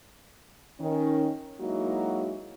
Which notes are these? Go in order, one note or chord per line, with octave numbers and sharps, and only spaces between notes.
D#3 C#4
F#3 G#3 A#3 D#4 E4 F#4